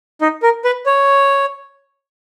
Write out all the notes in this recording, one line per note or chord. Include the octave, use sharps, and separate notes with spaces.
D#4
A#4
B4
C#5